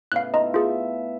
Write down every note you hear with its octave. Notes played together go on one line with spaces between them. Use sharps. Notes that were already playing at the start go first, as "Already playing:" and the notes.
A2 C#3 B3 F5 F#6
D#4 F4 A4 D#5 A#5
F4 G#4 E5